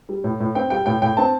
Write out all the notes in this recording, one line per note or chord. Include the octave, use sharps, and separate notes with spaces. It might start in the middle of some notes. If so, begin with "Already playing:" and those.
G3
A2
A2
C4 G5
G3 G5
A2 G5
A2 G5
C4 A5